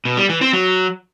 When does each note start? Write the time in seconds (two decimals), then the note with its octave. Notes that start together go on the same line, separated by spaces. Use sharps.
0.05 B2
0.17 G3
0.29 E3
0.41 C4
0.53 F#3